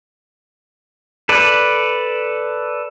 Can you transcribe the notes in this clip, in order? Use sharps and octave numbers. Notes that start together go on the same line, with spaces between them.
A4 B4 D5